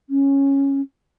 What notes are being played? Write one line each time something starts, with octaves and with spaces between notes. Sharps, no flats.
C#4